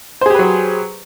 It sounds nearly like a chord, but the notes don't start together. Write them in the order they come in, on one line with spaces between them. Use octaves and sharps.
C5 G#4 G4 B4 F#3